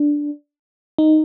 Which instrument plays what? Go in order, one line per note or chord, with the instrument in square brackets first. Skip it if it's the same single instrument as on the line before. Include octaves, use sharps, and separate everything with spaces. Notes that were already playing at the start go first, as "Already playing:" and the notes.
Already playing: [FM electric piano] D4
D#4